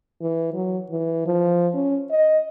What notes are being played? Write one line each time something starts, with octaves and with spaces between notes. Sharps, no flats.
E3
F#3
E3
F3
C#4
D#5